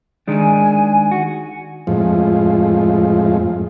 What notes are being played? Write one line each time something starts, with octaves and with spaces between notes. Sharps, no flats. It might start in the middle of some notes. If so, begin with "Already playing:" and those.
D#3 G#3 D4 G#5
F#4
F2 A2 F3 G#3